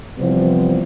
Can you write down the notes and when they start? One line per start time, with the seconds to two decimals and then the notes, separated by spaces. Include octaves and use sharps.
0.18 C3 E3 F3 G3 B3